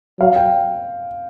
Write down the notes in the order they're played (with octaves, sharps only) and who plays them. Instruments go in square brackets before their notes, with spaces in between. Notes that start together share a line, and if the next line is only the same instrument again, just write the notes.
[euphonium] F#3 [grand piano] F5
[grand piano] G5